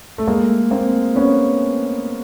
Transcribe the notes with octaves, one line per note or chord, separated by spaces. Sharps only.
A3
G#3 A#3
A#3 C4
B3 C#4